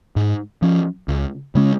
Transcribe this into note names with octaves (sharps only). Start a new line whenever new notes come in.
G#2
F3 C#4
C#2
C#3 G#3 C#4